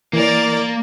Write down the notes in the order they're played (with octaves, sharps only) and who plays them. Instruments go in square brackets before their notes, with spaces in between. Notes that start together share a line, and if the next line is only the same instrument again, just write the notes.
[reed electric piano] E3 [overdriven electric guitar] A#3 [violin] A#4 D5